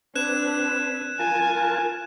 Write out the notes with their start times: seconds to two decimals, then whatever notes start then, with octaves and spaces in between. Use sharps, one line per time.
0.16 C4 D4 B4 F#6 G#6 E7
1.19 F4 A#4 G#5 A5